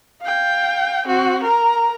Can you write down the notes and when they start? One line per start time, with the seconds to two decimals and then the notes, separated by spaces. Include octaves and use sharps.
0.21 F5 G5
1.06 C4 F#4
1.43 A#4 A#5